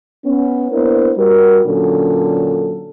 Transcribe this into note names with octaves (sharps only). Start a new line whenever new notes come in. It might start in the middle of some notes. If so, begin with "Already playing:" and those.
B3 C#4
A#3 B3 D4 E4 A#4 C5
G3 F#4 A#4
A#2 D3 F#3 C#4 D4 A4